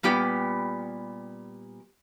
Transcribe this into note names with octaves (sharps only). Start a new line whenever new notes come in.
A#2 G3 B3 G4 G5